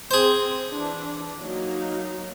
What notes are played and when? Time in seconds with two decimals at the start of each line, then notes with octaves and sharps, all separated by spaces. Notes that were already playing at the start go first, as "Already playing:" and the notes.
0.11 C4 G#4 C5
0.70 E3 D4
1.41 F#3 A#3 D#4